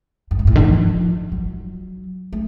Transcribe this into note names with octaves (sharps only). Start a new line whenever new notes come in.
F#2
G#2
A2
D3
F3
F#3
A3